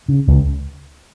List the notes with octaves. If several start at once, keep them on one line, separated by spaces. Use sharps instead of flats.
C#3
C#2